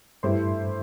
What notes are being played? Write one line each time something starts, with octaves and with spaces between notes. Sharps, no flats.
G2 A3 E4 G4 C5